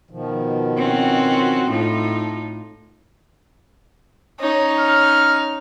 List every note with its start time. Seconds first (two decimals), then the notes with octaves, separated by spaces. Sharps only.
0.10 B2 D#3 F3
0.77 C4 C#4 F#4
1.71 A2 D#4 F4 A4
4.40 C#4 D#4
4.80 F6